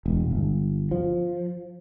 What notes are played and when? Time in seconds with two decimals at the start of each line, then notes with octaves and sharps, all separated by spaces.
0.06 E1
0.31 G1
0.91 F3